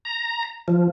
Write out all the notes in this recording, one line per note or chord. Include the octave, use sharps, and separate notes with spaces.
A#5
F3